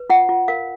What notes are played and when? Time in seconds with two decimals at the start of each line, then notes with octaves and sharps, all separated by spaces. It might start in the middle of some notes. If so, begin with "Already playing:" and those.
Already playing: B4
0.10 F4 F#5
0.29 F4
0.48 A#4 F5